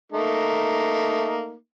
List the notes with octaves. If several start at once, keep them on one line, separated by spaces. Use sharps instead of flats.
A3 A#3 D#4